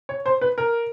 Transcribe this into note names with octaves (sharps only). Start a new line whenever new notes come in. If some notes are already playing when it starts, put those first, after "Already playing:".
C#5
C5
B4
A#4